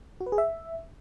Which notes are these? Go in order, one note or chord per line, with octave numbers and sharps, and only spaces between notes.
F#4
B4
G#4
E5